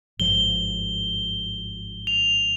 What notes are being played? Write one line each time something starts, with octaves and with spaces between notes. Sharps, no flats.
G#1 G2 F3 G7
F7